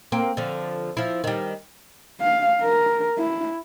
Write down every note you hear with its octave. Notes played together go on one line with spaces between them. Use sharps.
A#3 C4
D3 F3
F3 E4
D#3 G3
F5
A#4
E4